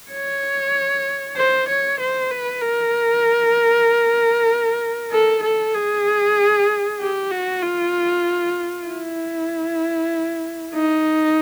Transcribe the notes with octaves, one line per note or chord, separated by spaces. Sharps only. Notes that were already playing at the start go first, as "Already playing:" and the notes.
C#5
C5
C#5
C5
B4
A#4
A4
A4
G#4
G4
F#4
F4
E4
D#4